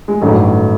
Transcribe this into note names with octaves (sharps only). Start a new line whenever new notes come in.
G#3
A1 G2 D#3 F#3 A3